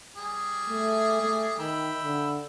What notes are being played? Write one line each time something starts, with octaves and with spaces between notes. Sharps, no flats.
G3 G#4
A3
A3
D#3 E5 G5 B5
D3